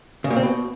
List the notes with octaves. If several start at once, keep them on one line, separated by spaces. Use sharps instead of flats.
C#3
A#2
C4
B2